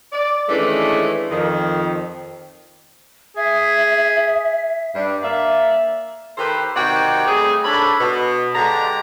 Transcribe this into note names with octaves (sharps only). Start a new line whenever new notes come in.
D5
D#3 E3 G#3 A3 C#4 D4
F2 D#3
G#4 E5
G2 D4
A#3 D5 E5
D#3 G4 A4 B4 C5
C3 D#3 D#4 F#4 D5 G5
G3 A3 C4 G#4
G#2 D4 A4 C#5 B5
B2
D3 G#3 G4 A#5